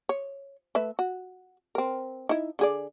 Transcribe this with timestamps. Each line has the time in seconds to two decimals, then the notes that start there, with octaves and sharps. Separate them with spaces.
0.09 C#5
0.75 A3 B4 E5
0.99 F#4
1.75 C4 A#4
2.29 D#4 E4
2.59 D3 G#4 D5